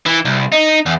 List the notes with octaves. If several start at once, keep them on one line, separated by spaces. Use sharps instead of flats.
E3
C2
D#4
E2